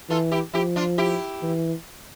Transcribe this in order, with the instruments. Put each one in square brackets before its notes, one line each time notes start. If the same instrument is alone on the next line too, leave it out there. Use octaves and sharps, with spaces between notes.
[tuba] E3 [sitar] F4 A4
[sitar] E4 G4
[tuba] F3 [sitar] E4 G4
[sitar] D4 F4
E4 G4
[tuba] E3